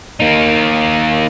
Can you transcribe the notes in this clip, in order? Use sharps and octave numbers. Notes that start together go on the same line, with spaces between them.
A#3 D#4